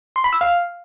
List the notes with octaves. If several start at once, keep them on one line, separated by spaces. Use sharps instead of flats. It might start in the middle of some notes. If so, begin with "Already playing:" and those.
C6
B5
E6
F5